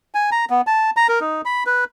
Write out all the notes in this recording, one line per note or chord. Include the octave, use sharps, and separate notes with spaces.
G#5
A#5
B3
A5
A#5
A#4
D#4
B5
B4